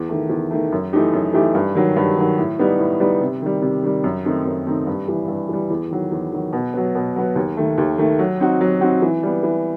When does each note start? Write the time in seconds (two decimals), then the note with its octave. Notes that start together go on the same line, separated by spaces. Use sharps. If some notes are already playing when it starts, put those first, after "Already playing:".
Already playing: E2
0.09 D#3 A3
0.30 E2
0.51 D#3 A3
0.72 F#2
0.93 E3 A3 D#4 G4
1.13 F#2
1.33 E3 A3 D#4 G4
1.55 G2
1.75 D#3 F#3
1.96 G2
2.18 D#3 F#3
2.38 A2
2.59 G3 B3 D#4
2.79 A2
3.00 G3 B3 D#4
3.21 C3
3.42 D#3 G3
3.62 C3
3.83 D#3 G3
4.04 F#2
4.25 D#3 A3 C4 D#4
4.45 F#2
4.67 D#3 A3 C4 D#4
4.87 G2
5.08 E3 G3
5.28 G2
5.49 E3 G3
5.70 E2
5.91 D#3 F#3
6.12 E2
6.32 D#3 F#3
6.53 B2
6.74 F#3 B3
6.95 B2
7.16 F#3 B3
7.36 D#2
7.57 D#3 A3
7.78 D#2
7.98 D#3 A3
8.19 F#3
8.40 C4 D#4 F#4
8.61 F#3
8.81 C4 D#4 F#4
9.02 E3
9.23 G3 B3
9.43 E3